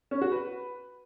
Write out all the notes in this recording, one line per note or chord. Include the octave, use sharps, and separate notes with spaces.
C#4
F#4
B4